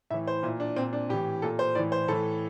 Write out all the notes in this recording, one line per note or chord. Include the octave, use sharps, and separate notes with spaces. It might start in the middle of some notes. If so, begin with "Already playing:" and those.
A2 E3 E5
C5
A#2 E4
D4
A#2 C4
D4
A2 E3 G4
A#2 A4
C5
A2 E3 D5
C5
A2 E3 A4